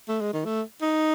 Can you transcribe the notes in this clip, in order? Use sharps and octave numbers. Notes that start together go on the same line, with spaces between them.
A3
G#3
D#3
A3
D#4